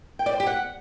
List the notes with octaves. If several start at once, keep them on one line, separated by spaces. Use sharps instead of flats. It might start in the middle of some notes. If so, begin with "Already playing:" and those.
G5
D5
C5
G4
F#5